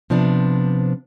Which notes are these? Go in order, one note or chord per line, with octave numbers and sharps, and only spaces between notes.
C3 F3 B3 D4